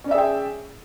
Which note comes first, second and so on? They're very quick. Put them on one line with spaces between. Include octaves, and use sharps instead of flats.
C#4 D5 E5 G#4 G5